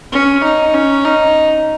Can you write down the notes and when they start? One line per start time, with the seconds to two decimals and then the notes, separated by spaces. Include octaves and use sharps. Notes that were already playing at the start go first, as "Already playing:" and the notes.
0.13 C#4
0.44 D#4
0.74 C#4
1.05 D#4